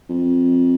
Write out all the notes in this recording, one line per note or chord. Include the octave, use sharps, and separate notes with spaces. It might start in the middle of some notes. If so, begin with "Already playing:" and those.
F2